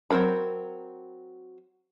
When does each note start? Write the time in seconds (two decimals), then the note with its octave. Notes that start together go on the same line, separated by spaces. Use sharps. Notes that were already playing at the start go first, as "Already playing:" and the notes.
0.10 F#3 C4 F4 A#4 B5